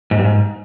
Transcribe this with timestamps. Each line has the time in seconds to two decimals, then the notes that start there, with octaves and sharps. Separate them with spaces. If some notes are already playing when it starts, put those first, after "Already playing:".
0.11 G#2
0.18 G2
0.25 G#2